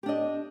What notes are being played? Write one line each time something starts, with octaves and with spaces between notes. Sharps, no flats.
D4 G4 D#5